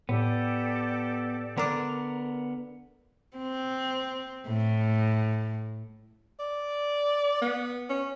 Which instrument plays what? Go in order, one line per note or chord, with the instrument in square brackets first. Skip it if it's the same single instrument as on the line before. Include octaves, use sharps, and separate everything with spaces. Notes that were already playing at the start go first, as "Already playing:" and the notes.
[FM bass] A2 [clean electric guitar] B3 [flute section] G4 A4 D5
[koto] D3 D4 [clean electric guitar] B3 A#4
[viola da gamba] C4
A2
[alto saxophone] D5
B3
C#4